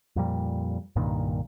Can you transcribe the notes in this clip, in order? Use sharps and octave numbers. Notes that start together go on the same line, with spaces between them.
F2 A#2 G3
C2 G2 A#2 D#3